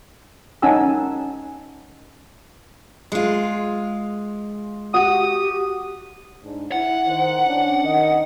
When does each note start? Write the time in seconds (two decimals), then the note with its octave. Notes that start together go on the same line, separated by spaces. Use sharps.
0.62 C#4 D#4 F#5 G#5 A5 E6
3.12 G#3 F4
4.94 F#4 G4 D#6
6.42 G#2 D4
6.72 E4 F#5
7.05 D#3 C5
7.47 C#4 D4
7.84 D#3 D#5